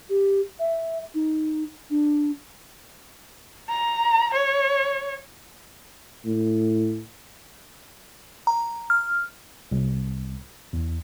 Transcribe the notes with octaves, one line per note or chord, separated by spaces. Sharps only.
G4
E5
D#4
D4
A#5
C#5
A2
A#5
F6
C2
E2